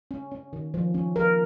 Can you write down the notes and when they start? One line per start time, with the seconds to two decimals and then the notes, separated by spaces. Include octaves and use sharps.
0.11 C#4
0.31 C#4
0.53 D#3
0.74 F3
0.94 C#4
1.16 F3 A#4